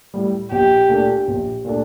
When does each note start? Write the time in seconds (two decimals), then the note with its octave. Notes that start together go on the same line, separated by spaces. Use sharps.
0.14 A2 G3
0.52 A#1 G4
0.89 A#2 A3 D4
1.28 A#1
1.65 A#2 A3 D4